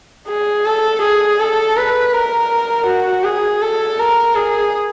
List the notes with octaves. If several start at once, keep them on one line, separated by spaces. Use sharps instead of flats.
G#4
A4
G#4
A4
B4
A#4
F#4
G#4
A4
A#4
G#4